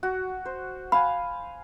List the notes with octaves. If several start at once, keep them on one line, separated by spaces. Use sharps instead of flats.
F#4
C5
F5 G#5 B5